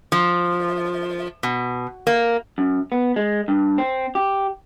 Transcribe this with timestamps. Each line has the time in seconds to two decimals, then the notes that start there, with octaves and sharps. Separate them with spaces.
0.12 F3
1.43 B2
2.07 A#3
2.58 F#2
2.92 B3
3.16 G#3
3.48 G2
3.78 C4
4.15 G4